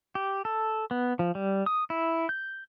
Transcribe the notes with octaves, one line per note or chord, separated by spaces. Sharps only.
G4
A4
B3
F3
G3
D#6
E4
G6